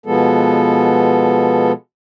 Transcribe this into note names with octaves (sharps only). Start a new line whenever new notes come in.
B2 F3 G#3 B3 A4